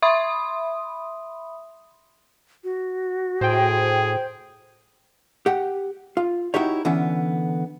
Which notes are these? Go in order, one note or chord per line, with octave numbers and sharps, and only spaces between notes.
E5 B5 C6 D#6
F#4
A2 G#4 C5 G5
G4 F#5
F4
D#4 E4 F#4 G4 C#5
D3 E3 B3 C#4